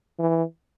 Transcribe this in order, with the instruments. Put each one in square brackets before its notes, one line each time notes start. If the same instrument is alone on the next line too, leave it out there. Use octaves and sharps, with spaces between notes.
[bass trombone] E3